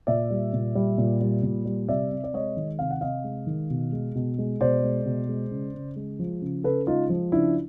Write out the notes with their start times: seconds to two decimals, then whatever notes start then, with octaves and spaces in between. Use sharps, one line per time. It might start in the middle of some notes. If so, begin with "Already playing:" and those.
0.07 A#2 D5 E5
0.30 G3
0.53 A#2
0.75 G3
0.98 A#2
1.21 G3
1.43 A#2
1.65 G3
1.88 C3 D5 E5
2.11 C3
2.24 D5
2.33 G#3 C#5 D#5
2.57 D#3
2.79 C3 F5
2.91 F#5
3.01 C3 D#5 F5
3.24 G#3
3.47 D#3
3.70 B2
3.92 G#3
4.15 B2
4.39 G#3
4.61 B2 C5 D5
4.83 G#3
5.06 B2
5.28 G#3
5.51 C#3
5.74 C#3
5.96 G#3
6.19 F3
6.42 C#3
6.64 C#3 A4 B4
6.87 G#3 D#4 F4
7.09 F3
7.32 C#3 D4 E4